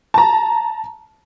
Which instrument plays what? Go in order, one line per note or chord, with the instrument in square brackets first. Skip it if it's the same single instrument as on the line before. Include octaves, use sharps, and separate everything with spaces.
[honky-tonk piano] A5 A#5